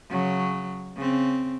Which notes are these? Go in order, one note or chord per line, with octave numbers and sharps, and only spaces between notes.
C#3 F#3
C#3 C4